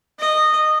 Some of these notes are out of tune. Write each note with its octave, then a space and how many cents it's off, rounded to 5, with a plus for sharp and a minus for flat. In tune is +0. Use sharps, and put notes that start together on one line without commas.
D#5 -15